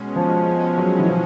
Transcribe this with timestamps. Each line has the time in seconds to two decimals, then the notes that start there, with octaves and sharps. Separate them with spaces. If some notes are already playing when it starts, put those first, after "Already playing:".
Already playing: B2 G#3 C#4
0.16 F3
0.78 F#3
0.99 E3
1.09 F3